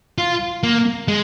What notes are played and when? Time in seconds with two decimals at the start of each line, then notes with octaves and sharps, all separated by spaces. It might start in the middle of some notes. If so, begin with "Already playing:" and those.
0.18 F4
0.63 A#3
1.08 G#3